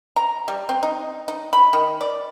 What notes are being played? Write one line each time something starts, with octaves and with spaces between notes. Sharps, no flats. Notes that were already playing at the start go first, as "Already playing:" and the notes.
A#5
G3
C4
D#4
D#4
B5
D#3
D5